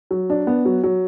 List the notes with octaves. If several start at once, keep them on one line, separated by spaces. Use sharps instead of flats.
F#3
D4
B3
F#3
F#3